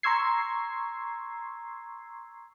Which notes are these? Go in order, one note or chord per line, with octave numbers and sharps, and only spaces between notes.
A#5 C6 C#6 E6 G#6 C7